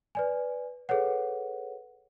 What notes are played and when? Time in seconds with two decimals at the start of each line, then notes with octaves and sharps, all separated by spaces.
0.15 B4 D5 G#5
0.89 G#4 A4 B4 C#5 F#5